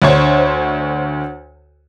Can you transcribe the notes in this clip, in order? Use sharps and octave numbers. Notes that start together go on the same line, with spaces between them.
D2 D3 C5 C#5